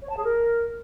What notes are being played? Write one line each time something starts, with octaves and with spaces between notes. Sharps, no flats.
C#5
A5
G#4
A#4